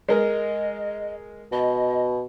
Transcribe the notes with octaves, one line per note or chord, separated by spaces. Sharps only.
G#3 A#4 D#5
B2 D#5